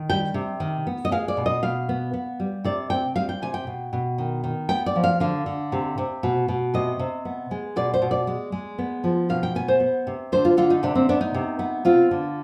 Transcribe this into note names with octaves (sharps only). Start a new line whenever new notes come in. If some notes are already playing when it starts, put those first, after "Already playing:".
Already playing: D#3
G3 G5
C3
D#3
B3
D#5
G#3 F5
D5
B2
D#5
B2 F5
B3
B3
G3
C3 D5
C4 G5
G3 F5
G5
C3 G#5
G5
B2
B2
D#3
D#3
B3 G5
D5
F3
F5
D3 F5
D3
C3
C3
B2
B2
C3 D#5
C3
B3
G#3
B2 D5
C5
B2
D5
G#3
G#3
B3
F3
B2 F5
G5
B3 G#5
C5
B3
C3
D3 C5
F4
D3 F4
D#4
C3 D4
C4
B3 D4
D#4
C3
B3
C4 F4
D3